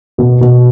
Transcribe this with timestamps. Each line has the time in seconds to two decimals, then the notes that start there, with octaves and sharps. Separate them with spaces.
0.18 B2
0.41 B2